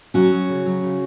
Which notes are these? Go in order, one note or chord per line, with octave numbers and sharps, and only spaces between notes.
F#3 C#4 F#4
F#3
C#3
F#3
C#3